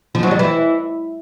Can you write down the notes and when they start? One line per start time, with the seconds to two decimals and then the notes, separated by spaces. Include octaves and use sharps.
0.15 F3
0.23 F#3
0.31 G3
0.39 E3